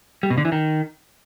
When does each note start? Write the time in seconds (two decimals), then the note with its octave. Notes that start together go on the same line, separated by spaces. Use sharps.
0.23 G3
0.30 B2
0.38 D3
0.45 E3
0.52 D#3